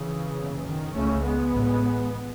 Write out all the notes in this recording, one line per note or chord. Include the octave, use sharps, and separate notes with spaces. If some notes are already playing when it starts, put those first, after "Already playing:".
Already playing: C#3 E3
F#1 E2 B2
D#3
C#2 C#3 A3 C#4
G#3 B3
A1 A2